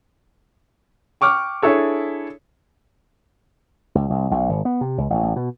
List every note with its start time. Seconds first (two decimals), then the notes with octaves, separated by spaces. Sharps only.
1.21 G5 C#6 D6 F6
1.62 D4 E4 G#4 A4 C#5
3.95 C#2
4.10 C2
4.31 B1
4.49 G#1
4.65 B3
4.81 C3
4.98 C#2
5.10 A1
5.23 A1
5.36 B2